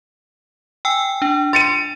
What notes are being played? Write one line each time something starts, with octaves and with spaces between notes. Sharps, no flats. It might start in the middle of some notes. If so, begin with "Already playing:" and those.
G5 G#5 E6
D4
C6 A6 C#7 D#7